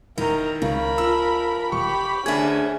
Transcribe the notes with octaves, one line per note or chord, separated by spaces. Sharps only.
E1 D#3 D#4 E4 A#4 A#5
C#2 C#3 A#4 B5
F3 E6
E1 G4 B5 C#6
D2 C#4 D4 G#4 E5 G#6